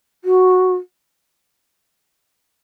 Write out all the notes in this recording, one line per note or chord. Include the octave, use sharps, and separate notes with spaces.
F#4